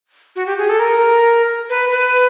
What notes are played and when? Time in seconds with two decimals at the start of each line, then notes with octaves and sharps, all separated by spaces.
0.36 F#4
0.46 G4
0.58 G#4
0.69 A4
0.80 A#4
1.70 B4
1.91 B4